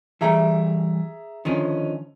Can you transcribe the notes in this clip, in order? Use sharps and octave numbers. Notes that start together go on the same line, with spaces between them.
E3 G3 A3 G#4 E5 A#5
D3 D#3 F3 C#4 D#4